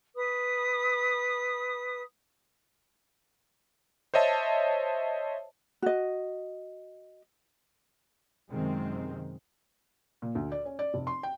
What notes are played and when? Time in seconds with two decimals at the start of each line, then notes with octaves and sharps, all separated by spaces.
0.16 B4 D#6
4.14 C5 C#5 D#5 E5 A5
5.82 F#4 D#5
8.51 F#2 C3 D#3 G#3 C4
10.22 A#2
10.35 D2
10.52 D5
10.65 C#4
10.79 D5
10.94 F1
11.07 C6
11.23 G5